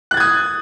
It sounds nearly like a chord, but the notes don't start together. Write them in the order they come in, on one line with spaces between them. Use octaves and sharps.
F#6 A6 G#6 D#6